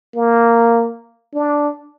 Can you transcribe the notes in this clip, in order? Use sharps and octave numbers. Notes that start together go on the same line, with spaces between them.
A#3
D4